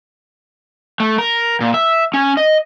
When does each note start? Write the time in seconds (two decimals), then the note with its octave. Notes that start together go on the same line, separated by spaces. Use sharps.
1.00 A3
1.18 A#4
1.61 A#2
1.74 E5
2.14 C#4
2.37 D#5